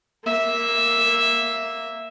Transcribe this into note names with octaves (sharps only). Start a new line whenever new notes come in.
A#3 E5